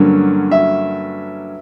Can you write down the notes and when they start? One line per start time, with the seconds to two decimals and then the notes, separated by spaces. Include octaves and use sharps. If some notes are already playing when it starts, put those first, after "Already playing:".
Already playing: G2 D3 F#3 A#3 C#4
0.51 E5